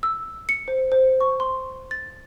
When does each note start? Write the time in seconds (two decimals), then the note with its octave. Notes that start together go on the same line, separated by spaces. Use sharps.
0.03 E6
0.49 C#7
0.68 C5
0.92 C5
1.21 C#6
1.40 C6
1.91 A6